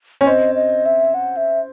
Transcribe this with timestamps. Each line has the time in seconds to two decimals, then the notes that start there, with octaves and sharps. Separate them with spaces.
0.21 C#4
0.27 C4 D#5
0.55 D#5
0.86 E5
1.14 F#5
1.37 E5